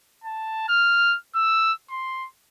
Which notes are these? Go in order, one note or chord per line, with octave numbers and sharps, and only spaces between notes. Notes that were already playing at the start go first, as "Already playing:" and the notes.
A5
F6
E6
C6